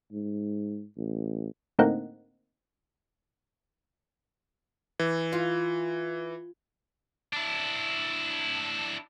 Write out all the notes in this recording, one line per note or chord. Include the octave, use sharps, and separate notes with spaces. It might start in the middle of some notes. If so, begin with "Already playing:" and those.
G#2
A1
A2 D3 A#3 C4 D#4 F#5
E3
F4
D4 E4